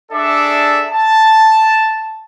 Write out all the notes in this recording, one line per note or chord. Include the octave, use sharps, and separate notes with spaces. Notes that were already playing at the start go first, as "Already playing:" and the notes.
D4 G#4 A4 D5 E5
A5